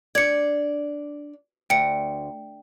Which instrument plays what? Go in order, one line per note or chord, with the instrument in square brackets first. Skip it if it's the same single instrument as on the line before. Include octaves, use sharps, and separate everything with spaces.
[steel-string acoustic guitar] D4 D5 [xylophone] G#6 C#7
[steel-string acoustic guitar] D2 [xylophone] G5 C#7